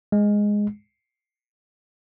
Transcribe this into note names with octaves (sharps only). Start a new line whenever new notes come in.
G#3